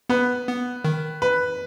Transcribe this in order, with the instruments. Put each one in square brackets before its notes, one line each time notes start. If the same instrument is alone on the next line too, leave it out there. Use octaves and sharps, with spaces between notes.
[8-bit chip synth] B3 [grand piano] B4
[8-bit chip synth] B3
D#3
[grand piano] B4